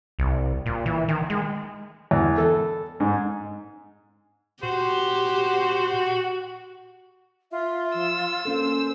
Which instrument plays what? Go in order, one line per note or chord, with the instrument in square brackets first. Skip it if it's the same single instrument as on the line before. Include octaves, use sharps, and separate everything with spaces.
[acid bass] C2
A#2
E3
D#3
G#3
[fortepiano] E2
A4
G#2
[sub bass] A#2 [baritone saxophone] F#4 [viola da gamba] G4 [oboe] C5
[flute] F4 [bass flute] E5
[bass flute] F3 [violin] E6
[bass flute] A#3 [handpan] C#4 A4 [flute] C5